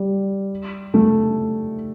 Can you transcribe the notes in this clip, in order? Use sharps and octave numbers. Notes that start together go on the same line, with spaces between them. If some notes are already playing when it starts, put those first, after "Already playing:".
Already playing: G3
A3